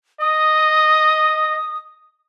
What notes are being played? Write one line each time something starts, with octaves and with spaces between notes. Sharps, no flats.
D#5 D#6